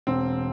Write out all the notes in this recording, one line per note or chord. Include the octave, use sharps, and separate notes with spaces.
E1 C4